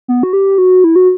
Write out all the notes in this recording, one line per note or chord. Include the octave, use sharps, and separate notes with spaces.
B3
F#4
G4
F#4
E4
F#4